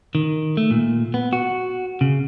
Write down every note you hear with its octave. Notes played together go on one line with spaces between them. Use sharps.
D#3
A3
A#2
B3
F#4
C#3